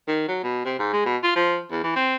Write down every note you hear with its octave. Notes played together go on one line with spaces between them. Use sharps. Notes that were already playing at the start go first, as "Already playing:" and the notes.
D#3
F#3
B2
C3
G#2
G#3
B2
F4
F3
E2
E3
C4